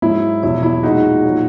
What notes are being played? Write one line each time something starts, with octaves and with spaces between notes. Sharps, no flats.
G#2 F#3 E4
E2 B2 F#3 E4
E4
A#2 G#3 D#4 F#4
A#2 F#3